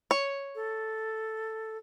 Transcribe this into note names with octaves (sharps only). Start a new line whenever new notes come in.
C#5
A4